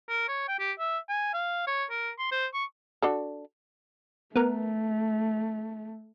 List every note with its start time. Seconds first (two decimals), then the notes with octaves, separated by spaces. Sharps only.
0.09 A#4
0.28 C#5
0.48 G5
0.59 G4
0.79 E5
1.09 G#5
1.34 F5
1.67 C#5
1.90 A#4
2.19 C6
2.31 C5
2.54 C#6
3.02 D4 F#4 A4
4.36 A3 B3 A#4